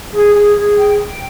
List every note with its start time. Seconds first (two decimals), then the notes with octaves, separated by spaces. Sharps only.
0.13 G#4
0.34 G#4
0.56 G#4
0.77 G5
0.98 G5